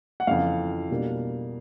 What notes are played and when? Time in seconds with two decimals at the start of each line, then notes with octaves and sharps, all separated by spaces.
0.20 F#5
0.27 F2 C#3 E3 F5
0.90 B2 G3 A#3 D4